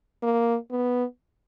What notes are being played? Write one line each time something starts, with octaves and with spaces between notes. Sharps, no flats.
A#3
B3